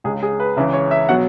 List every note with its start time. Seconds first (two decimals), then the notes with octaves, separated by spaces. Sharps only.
0.04 C#2 C#3 G#3 G#4
0.23 G#4
0.40 B4
0.57 C#2 C#3 E3 E5
0.73 C#5
0.91 E5
1.09 B2 F#3 F#5